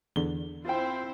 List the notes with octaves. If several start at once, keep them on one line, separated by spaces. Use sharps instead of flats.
E2 D3 G7
C4 E4 F4 C5 G5